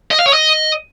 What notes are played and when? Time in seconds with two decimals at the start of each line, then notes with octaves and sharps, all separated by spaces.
0.11 D#5
0.19 F5
0.26 C#5
0.33 D#5